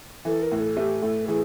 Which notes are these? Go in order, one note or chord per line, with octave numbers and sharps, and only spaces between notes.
E3 A4
A#4
A2
A4
A3 G4
A2 A4
E3 G#4